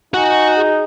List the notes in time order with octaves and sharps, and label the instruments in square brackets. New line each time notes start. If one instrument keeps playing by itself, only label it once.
[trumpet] D#4 [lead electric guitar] F#4 F#5 [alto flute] G#5
[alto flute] G#4